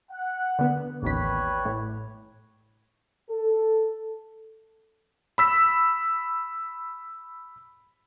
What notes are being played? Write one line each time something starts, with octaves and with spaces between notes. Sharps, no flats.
F#5
D3 B3
A1 D#2 G3 B4 C#5 B6
A2
A4
B5 E6 B6